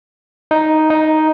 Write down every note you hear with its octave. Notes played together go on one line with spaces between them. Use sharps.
D#4
D#4